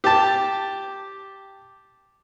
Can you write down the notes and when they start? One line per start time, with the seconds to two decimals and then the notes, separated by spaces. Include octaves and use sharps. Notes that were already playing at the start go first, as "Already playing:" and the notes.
0.04 G4 A5